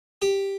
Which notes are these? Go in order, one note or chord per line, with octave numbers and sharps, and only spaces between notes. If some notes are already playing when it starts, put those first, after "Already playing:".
G4